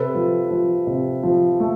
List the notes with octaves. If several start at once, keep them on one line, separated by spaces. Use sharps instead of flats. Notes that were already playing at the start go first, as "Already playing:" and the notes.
Already playing: C3 A4 B4
F3
F3
C3
F3
A3